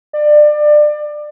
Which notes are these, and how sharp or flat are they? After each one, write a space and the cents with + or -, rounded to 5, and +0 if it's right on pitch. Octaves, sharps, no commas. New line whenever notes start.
D5 +25